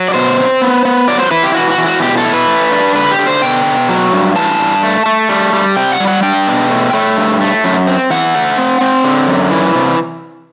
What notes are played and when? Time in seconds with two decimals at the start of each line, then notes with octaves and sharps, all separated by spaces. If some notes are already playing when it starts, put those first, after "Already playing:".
Already playing: F#3
0.08 D5
0.14 B2 C5
0.38 C4
0.61 B3
0.85 B3
1.08 F#3 D5
1.20 C5
1.31 E4 B4
1.43 G4
1.54 E3 F#4
1.70 F#4
1.78 E3
1.86 F#4
2.01 B2 G4
2.17 A4
2.25 E4
2.33 B4
2.48 A3
2.72 D4
2.95 D3 B4
3.11 G4
3.19 D3
3.27 C5
3.42 B2 G5
3.66 B2
3.89 F#3
4.13 G2
4.36 E3 A5
4.59 G2
4.83 A3
5.06 A3
5.29 G3
5.53 G3
5.76 C3 G5
5.92 F#5
6.00 G3
6.07 F#5
6.23 D4 G5
6.47 B2
6.70 A3
6.93 A3
7.17 G2
7.41 A3
7.64 F#2
7.87 C4
8.10 E3 F#5
8.34 A3
8.58 C4
8.81 C4
9.04 D3
9.28 F#2
9.51 E3
9.75 C3